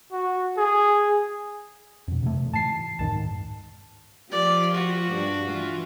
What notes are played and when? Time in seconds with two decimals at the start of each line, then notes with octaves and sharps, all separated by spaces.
0.12 F#4
0.57 G#4
2.08 F2 B2
2.23 C3 E3 A3
2.53 G#2 E3 A5 C7
2.99 C#2 F#2 A2 D#3 A5
3.13 G#2
4.31 F3 F4 G4 D5
4.74 F#4
5.12 G2 D4
5.48 E3 F4